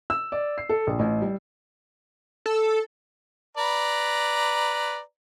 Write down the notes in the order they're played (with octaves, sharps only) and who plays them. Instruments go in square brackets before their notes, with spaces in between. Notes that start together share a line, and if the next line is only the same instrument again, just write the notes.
[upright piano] E6
D5
C7
A4
A#1
A1
G3
[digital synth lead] A4
[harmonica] B4 D5 A#5